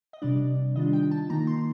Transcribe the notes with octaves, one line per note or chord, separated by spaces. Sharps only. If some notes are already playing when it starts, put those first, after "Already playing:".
D#5
C3 G3 D4 D5
D#3 G3 D4 F4 D#5
G5
A5
D#3 A#3 D#4 A#5
C6